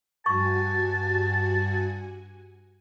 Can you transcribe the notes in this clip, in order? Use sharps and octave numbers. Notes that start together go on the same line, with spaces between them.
G2 F#4 G#5 A5 C#6